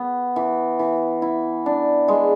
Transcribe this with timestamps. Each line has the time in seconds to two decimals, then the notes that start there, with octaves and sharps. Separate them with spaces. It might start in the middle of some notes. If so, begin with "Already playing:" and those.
Already playing: B3
0.36 E3
0.79 E3
1.22 E4
1.66 D4
2.08 G#3